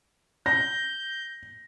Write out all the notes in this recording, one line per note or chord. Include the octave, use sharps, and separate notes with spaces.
G6 A#6